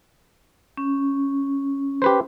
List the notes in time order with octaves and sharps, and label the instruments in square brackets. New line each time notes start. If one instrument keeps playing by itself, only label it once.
[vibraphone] C#4
[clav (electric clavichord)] G4 B4 C5